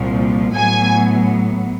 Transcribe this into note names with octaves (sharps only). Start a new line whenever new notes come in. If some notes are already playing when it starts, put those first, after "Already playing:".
Already playing: C2 A#2 F3
A2 F#3 B3 G#5